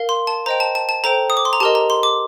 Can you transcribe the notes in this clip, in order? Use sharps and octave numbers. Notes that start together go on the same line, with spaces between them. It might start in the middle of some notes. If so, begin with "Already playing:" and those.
Already playing: A#4 F5
C6
A5
C5 D#5 G5 A#5
A5
A5
A5
A4 C5 G5 A#5
D#6
D6
C6
A#5
G4 A#4 D#5 A5
A#5
C6
D6